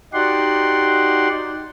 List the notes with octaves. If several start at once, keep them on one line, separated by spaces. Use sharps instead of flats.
D#4 F#4 G4 D5 F#5 C6